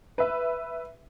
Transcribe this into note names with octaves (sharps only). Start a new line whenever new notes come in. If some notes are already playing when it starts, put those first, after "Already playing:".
B4 E5